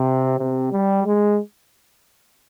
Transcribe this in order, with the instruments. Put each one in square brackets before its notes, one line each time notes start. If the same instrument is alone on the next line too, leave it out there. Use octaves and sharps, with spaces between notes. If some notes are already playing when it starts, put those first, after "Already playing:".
Already playing: [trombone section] C3
C3
G3
G#3